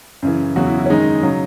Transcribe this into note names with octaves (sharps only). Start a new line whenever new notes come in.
F#2 C#3 E3
E2 C#3 F#3 F#4
E4
E4
C#4
F#2 D#3 G#3 D#4
C#3 F#3